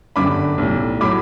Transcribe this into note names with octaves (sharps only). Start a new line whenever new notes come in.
G1 F#2 D3 G3 B5 D6
B1 A2 G3
A2 F#3 B5 D6